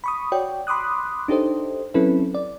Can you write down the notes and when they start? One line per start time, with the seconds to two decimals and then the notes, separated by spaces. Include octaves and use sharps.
0.04 B5 C#6 D#6
0.32 F#4 C#5 D5 G5
0.67 B5 C6 D6 D#6 F#6
1.28 D4 D#4 G4 A4 C5 D#5
1.94 F#3 C4 C#4 E4 A4 B4
2.34 D5